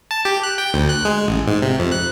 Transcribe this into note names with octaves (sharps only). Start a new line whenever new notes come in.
A5
G4
F#6
G5
D2
F#6
G#3
A1
G#2
C3
F2
F#6